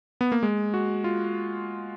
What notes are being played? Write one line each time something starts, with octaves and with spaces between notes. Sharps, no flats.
B3
A#3
G#3
F#4
F4